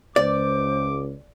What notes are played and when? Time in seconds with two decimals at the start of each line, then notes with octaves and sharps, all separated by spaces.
0.16 C#2 C5 D5 D6